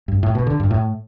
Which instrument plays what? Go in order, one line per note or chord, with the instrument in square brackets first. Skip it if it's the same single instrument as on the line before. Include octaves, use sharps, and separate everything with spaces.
[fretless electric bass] G2
A2
B2
D3
G2
A2